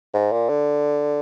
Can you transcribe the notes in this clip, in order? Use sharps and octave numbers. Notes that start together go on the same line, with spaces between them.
G#2
A#2
D3